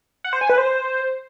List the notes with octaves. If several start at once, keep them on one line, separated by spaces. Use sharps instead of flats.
F#5
C5
G#5
B4
C5